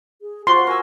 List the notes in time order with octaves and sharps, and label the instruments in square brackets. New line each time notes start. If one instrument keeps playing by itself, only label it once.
[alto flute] G#4
[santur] F4 F#4 [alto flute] C5 [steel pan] C6
[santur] A#4 G#5 E6 [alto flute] C#6